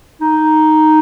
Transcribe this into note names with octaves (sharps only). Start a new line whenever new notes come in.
D#4